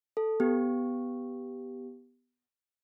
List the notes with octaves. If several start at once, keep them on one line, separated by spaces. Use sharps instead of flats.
A4
B3 G4